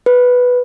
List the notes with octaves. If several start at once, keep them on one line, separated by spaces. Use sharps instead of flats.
B4